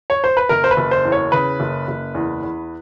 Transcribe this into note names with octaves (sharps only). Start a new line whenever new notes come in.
C#5
C5
B4
F#1 A#4
C5
B4
F#1
C5
E2
C#5
C#3 B4
F#1
F#1
E2
E2